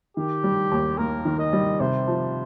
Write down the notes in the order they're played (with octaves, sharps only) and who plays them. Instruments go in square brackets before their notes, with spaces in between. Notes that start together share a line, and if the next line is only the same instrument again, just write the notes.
[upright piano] D#3 [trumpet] G4
[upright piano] G3
D#2
[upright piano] A#3 [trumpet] A#4
[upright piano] D#3
[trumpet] D#5
[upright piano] G3
[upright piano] C3 [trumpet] C5
[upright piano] F3